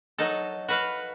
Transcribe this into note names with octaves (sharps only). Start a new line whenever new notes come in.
F#3 D#4 A4
F#4 B4 F5